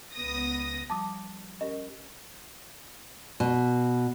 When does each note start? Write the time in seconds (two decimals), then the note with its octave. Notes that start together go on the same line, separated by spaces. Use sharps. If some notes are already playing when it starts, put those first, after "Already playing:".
0.14 C#2 B3 D#6 A#6
0.90 F3 G3 A5 D6 D#6
1.61 C#4 G4 A#4 D#5
3.40 B2